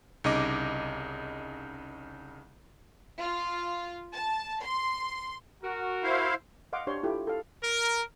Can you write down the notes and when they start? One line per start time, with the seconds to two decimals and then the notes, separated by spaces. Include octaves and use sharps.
0.24 C2 C#3 D#4 D#5 D6
3.19 F4
4.15 A5
4.62 C6
5.63 F#4 A#4
6.04 E4 C5 F5
6.73 D#5 F5 F#5 C6 D6
6.87 D4 G4 C5 C#5 C6
7.03 E4 F4 G4 A4
7.27 A4 F5
7.63 A#4